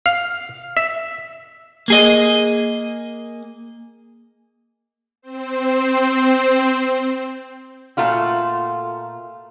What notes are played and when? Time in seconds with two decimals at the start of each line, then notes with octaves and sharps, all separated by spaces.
0.06 F5
0.77 E5
1.88 A#3 G#4 D#5
5.22 C4 C5
7.97 A#2 A3 F4 F#4